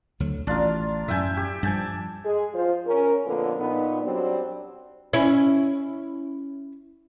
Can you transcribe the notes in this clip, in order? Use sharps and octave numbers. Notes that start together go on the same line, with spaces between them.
D2 D3 F#3
A1 D4 F4 A#4
F#2 A2 E5 G5 G#5
G4
G2 F3 G#5 A5
G#3 G#4
F3 F4 C5
C#4 A#4
F2 A#2 D3 A#3 B3
A#2 B3 D#4
F#3 G3 C4 D4 D5
C#4 E4